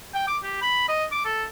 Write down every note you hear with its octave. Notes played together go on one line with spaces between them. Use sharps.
G5
D6
G4
B5
D#5
D6
A4